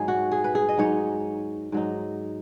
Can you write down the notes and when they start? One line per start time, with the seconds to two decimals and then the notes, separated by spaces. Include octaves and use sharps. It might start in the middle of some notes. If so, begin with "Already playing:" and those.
Already playing: G#2 F#3 D#4 G#4
0.08 F#4
0.31 G#4
0.44 B4
0.55 G#4
0.69 D#5
0.78 G#2 F#3 D#4 C#5
1.72 G#2 F#3 D#4